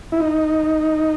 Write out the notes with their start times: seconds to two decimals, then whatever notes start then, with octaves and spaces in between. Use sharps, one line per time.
0.12 E4
0.20 D#4